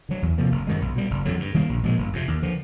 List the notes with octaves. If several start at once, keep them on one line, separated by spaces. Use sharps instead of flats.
D3 F#3
E2
C3 F3 A#3
F#1
F#2 D#3 G#3
B1
B2 G3
F#1
F2 D3 F#3
G2
D#3 G3 A#3
A#1
A#2 F3 G#3
G1
F2 C3
D#2
D3 F3